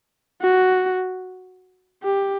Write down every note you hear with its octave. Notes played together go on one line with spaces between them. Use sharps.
F#4
G4